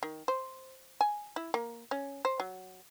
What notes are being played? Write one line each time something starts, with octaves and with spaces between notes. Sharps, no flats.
D#3
C5
G#5
E4
A#3
C#4
C5
F#3